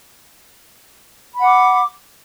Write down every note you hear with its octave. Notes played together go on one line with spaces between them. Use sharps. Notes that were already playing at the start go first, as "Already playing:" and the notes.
F#5 B5 D6